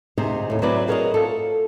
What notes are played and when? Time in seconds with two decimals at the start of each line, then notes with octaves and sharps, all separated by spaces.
0.18 D2 C3 D#4 G#4 C5
0.50 D#2 A2
0.62 F#3 C4 E4 B4 D5
0.87 F#4 G#4 A#4 B4 C#5 D#5
1.14 F4 A4